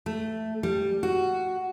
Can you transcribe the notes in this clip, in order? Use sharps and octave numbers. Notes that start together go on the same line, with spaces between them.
A3
G3
F#4